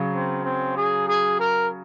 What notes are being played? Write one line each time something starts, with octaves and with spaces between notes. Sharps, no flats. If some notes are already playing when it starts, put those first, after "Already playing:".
Already playing: C#3 F#3
C4
C4
G#4
G#4
A#4